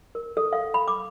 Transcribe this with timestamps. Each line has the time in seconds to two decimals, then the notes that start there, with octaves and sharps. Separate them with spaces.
0.15 A#4
0.37 A4
0.53 F5
0.74 B5
0.88 D6